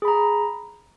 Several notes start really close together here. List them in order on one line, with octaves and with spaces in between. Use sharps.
G#4 B5 A#5